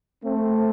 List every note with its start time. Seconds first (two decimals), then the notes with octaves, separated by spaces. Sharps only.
0.23 A3 C4